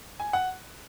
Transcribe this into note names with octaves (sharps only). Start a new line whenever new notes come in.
G#5
F#5